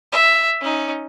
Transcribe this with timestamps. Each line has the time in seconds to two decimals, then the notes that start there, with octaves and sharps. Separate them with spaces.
0.12 E5
0.61 C#4 D#4